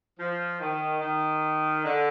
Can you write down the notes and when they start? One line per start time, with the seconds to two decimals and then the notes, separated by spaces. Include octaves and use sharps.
0.19 F3
0.60 D#3
1.01 D#3
1.83 D3